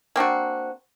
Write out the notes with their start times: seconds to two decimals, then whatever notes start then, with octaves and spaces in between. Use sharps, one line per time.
0.16 A#3 C4 D4 F#4